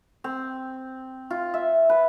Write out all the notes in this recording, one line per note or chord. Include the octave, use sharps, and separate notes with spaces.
C4
F4
E5
B4